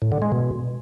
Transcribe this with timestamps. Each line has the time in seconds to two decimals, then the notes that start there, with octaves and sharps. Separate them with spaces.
0.02 A2
0.12 D3
0.22 G#3
0.32 B2